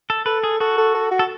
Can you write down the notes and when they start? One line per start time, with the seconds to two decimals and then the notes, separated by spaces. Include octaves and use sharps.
0.10 A4
0.26 A4 B4
0.44 G#4
0.60 F#4 A4
0.78 A4
0.95 A4
1.11 F#4
1.19 A4